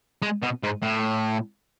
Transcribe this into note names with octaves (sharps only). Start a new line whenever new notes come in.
G#3
B2
G#2
A2